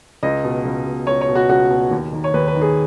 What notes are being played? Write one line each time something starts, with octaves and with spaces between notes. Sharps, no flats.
C#2 D#5
B2
C#2
B2
C#2 C#5
C#5
B2
F#4
C#2 F#4
B2
D#2
D#3
C#5
D#2 B4
B4
D#3
G#4